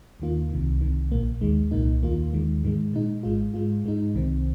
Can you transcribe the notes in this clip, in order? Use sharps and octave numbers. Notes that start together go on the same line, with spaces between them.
D#2 D#3 A#3 F4
C2 C3 D#3
C2 C3 D#3
A#1 A#2 A#3
D#2 D#3 G#3
C2 A#2 A#3 D#4
D#2 D#3 A#3 F4
D#2 D#3 G#3
G#2 D#3 G#3
A#2 G#3 D#4
G#1 G#2 G#3 F4
G#2 G#3 F4
G#2 G#3 D#4
C2 C3 D#3 C4